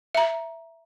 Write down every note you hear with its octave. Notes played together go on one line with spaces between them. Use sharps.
E5 A#5